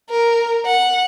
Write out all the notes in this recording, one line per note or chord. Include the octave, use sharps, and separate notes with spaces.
A#4
F#5